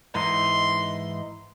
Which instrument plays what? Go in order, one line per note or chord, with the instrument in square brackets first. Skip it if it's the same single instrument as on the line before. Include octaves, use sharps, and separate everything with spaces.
[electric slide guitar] G#2 E3 D#4 [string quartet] C6